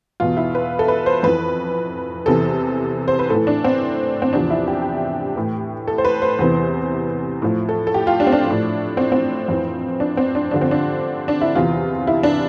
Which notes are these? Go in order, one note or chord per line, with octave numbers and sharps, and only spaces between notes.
E2 B2 F4
E4
B4
A4
B4
C5
F2 E3 B4
E2 C3 E3 A4
C5
B4
A2 E3 A4
D4
C4
C4
E2 C3 F3 D4
E4
G4
A2 E3
A4
C5
B4
C5
E2 C3 E3
A2 F3
A4
A4
G4
F4
D4
C4
D4
A2 F3
C4
C4
F2 E3
D4
C4
D4
G2 D3 F3 D4
C4
D4
D4
E4
E2 C3 E3 F4
E4
D4